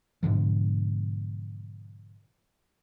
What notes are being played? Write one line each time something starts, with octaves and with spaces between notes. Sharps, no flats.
G#2 B2 D3 F3